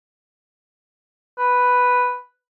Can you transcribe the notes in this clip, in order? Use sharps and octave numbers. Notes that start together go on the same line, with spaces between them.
B4